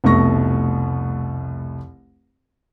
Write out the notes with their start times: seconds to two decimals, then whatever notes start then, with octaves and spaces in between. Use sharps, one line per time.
0.04 F1 C2 B2 A3 C#6 A#6